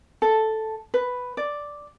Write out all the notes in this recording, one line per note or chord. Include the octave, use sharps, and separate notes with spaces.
A4
B4
D5